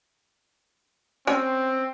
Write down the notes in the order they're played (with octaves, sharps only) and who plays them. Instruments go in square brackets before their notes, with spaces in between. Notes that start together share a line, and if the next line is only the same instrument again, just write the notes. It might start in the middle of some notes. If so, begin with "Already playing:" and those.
[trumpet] C4 [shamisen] C#4 G#5